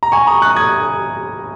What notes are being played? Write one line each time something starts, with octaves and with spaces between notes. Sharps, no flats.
A#5
G#5 C#6
A#5 D#6
C#6 F#6
D#6 G#6